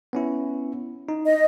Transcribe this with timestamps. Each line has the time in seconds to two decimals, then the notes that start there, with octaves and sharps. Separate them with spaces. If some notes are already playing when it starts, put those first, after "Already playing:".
0.13 B3 C#4 E4
1.09 D#4
1.26 D#5